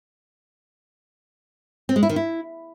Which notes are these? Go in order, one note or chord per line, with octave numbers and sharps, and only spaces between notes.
C4
G#3
E4
D#3
E4